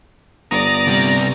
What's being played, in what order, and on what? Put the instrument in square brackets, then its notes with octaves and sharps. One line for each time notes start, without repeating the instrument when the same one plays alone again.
[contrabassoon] G1 [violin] D5 [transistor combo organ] A#5 D#6
[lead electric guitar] C3 G3 [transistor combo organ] A#5